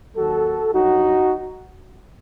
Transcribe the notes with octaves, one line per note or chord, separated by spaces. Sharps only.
D#2 D#3 F#3 F#4 A4
G2 F#3 D#4 F#4